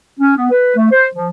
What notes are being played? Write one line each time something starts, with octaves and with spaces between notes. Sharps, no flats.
C#4
B3
B4
A3
C5
F3